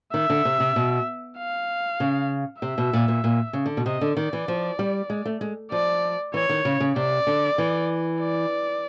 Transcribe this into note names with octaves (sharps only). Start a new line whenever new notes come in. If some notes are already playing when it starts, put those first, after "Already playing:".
D#3 E5
D3
C3
C3
B2
F5
C#3
C3 E5
B2
A#2
A#2
A#2
C#3
D3
B2
C3 D#5
D3
D#3 D5
E3
F3
G3
G#3
A3
G#3
F3 D5
E3 C#5
D#3
C#3
C#3
C3 D5
D3
E3
D5